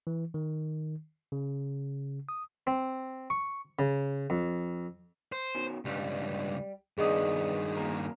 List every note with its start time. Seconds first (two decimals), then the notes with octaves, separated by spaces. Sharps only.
0.07 E3
0.34 D#3
1.32 C#3
2.29 D#6
2.67 C4
3.30 C#6
3.79 C#3
4.30 F2
5.32 C5
5.55 B2 D#3 C#4
5.85 C#2 G2 G3
6.98 C2 G2 D#3 B3 G#4 D5 D#5 D#6
7.77 C#3 A#3 A#4